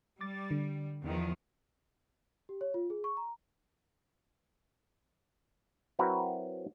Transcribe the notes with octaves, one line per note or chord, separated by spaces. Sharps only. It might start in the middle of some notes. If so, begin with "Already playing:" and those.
G3 D6 A6
D3
E2 D#3 F3
G4
C#5
F4
G#4
C#6
A#5
F#3 C4 E4 F#4 A#4 B4